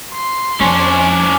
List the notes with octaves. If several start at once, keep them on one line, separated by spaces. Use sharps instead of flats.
C6
F2 F3 C#4 D4